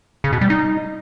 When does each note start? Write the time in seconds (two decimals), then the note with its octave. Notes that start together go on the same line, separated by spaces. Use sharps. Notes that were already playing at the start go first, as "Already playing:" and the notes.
0.24 C#3
0.33 B2
0.41 G3
0.50 D#4